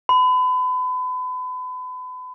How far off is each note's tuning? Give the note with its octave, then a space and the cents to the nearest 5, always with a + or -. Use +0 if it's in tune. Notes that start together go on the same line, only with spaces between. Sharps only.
B5 +35